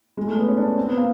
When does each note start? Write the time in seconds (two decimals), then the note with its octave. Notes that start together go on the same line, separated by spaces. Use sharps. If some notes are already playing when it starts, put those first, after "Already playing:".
0.17 G#3
0.27 A3
0.37 B3
0.47 C#4
0.57 D4
0.67 C#4
0.77 C4
0.87 B3
0.97 A#3